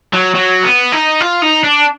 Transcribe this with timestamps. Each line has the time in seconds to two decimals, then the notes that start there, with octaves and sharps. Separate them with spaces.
0.14 F#3
0.35 F#3
0.64 B3
0.92 D#4
1.21 F4
1.42 D#4
1.64 D4